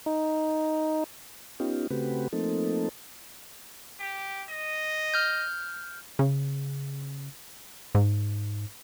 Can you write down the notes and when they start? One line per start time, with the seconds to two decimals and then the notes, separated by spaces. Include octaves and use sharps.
0.06 D#4
1.60 B3 C#4 D#4 F4 G4
1.91 C#3 A3 C4 F#4 G4 B4
2.33 F3 A3 A#3 C4 D#4 A4
4.00 G4
4.50 D#5
5.14 F6 G6
6.19 C#3
7.95 G#2